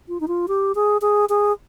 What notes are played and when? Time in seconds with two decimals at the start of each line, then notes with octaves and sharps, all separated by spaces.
0.08 F4
0.20 D#4
0.28 F4
0.48 G4
0.75 G#4
1.01 G#4
1.29 G#4